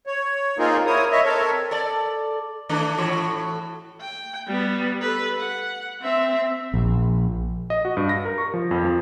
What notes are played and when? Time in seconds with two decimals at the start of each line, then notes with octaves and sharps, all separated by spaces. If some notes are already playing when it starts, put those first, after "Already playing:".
0.07 C#5
0.58 A#3 C4 D#4 F4 G#4 A#4
0.86 E4 A#4 C#5 D#6
1.11 C#5 D#5 E5
1.25 C4 A4 A#4 C#5
1.71 A4 D5
2.69 D#3 A3 D4
2.97 A2 E3 F#4
4.01 G5
4.48 G3 B3
5.01 A4 B4
5.38 F#5
6.02 C4 E5
6.74 A#1
7.70 D#5
7.85 F#4
7.97 G2
8.09 A#6
8.25 A#4
8.38 C#6
8.54 F3
8.71 F2
8.85 F3